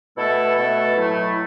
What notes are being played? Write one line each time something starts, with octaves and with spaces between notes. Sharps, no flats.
B2 A3 E4 A4
B2 A3 E4 A4
A2 F#3 A3 E4